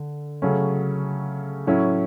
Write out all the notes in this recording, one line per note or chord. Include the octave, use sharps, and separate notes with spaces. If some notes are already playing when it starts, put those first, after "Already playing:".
Already playing: D3
C#3 F#3 A3 C#4
A2 F#3 C#4 E4